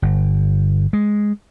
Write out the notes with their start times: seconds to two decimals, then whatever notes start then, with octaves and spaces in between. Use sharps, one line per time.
0.02 G1
0.93 G#3